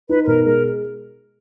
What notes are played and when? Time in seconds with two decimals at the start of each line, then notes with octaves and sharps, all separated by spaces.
0.09 D#4 B4
0.23 B4
0.27 B2 A#4
0.44 G#3 A#4